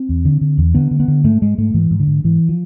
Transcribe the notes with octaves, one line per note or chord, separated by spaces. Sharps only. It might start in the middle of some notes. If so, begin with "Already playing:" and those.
Already playing: C4
E2
D3
D3
E2
D3 B3
D3
B3
D3
G#2 A3
G#2 G#3
G#2 A3
G#2 E3
G#2
D3
G#2
G#2 E3
F3